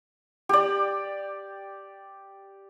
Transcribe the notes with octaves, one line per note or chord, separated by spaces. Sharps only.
G4 D5